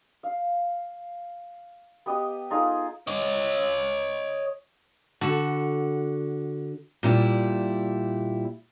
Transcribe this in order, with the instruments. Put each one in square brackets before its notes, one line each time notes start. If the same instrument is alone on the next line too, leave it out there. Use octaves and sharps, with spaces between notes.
[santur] F5
B3 G4 D#5 A5
D#4 F4 G#4 A4
[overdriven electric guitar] C#5 D#5
[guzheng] D3 F#4 A5
[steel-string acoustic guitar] A#2 G3 E4